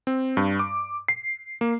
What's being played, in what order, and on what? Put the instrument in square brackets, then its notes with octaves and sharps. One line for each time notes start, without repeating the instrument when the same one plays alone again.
[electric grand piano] C4
G2
D6
C7
A#3